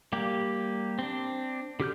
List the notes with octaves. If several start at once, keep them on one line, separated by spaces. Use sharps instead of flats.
G3 A#3 G4
C4 D4
D3 G4 F6 G6